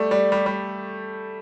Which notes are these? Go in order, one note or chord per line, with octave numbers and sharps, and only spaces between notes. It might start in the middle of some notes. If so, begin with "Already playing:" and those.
Already playing: G3 A3
G3
G3
G3